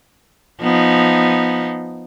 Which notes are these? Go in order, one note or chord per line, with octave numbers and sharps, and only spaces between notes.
F3 B3 D#4